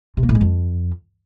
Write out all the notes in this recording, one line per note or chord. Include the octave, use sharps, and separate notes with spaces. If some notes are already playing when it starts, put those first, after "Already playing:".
C3
A#3
A2
G#3
F2